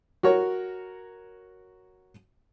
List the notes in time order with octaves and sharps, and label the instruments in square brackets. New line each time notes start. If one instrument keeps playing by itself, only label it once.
[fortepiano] F#4 A#4 C#5